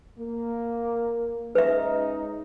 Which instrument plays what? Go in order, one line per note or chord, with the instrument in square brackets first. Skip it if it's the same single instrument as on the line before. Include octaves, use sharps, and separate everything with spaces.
[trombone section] A#3
[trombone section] G#3 C#4 D#4 [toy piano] B4 E5